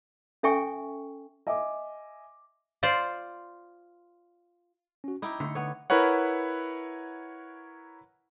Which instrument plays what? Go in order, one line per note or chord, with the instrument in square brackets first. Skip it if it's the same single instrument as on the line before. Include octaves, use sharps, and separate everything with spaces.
[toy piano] C#4 A4 E5 G5 G#5 C#6
[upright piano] D#5 E5 G#5 D6
[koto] F4 C5 D5
[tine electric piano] C#4 F#4
[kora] D#4 E4 G5 [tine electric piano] B5 D6
[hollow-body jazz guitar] D3 A3
[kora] B3 C#5
[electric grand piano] E4 A#4 B4 C#5 F#5